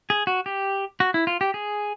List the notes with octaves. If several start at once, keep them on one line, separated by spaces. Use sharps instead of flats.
G#4
F#4
G4
F#4
E4
F4
G4
G#4